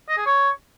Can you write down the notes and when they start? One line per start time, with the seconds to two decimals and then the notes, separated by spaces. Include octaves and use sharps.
0.08 D#5
0.17 G#4
0.26 C#5